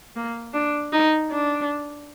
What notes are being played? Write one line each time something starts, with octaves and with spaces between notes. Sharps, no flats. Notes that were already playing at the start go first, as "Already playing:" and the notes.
A#3
D4
D#4
D4